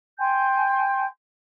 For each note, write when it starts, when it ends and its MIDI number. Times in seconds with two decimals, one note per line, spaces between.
0.20 1.05 79
0.20 1.05 80
0.20 1.05 84
0.20 1.05 91